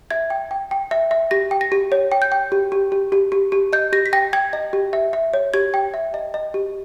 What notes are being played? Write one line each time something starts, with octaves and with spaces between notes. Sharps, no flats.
E5 G#6
G5
G5
G5
E5
E5
G4 A#6
G5
A#6
G4
C#5
G5
G6
G5
G4
G4
G4
G4
G4
G4
D#5 G6
G4 A#6
B6
G5 A#6
G5 G#6
D#5
G4
E5
E5
C#5
G4 G#6
G5
E5
D#5
D#5
G4